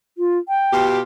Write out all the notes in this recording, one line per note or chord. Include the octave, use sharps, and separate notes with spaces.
F4
G5
B2 F4 G4